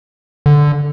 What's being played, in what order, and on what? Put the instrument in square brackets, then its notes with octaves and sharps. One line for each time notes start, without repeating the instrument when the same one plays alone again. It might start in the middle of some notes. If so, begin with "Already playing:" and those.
[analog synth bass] D3